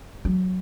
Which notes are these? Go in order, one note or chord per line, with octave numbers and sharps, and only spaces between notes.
F#3